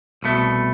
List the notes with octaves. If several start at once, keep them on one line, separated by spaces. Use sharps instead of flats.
C2 B2 A3